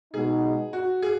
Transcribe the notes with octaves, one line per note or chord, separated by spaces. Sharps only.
B2 G#3 D#4 G#4
F#4
G#4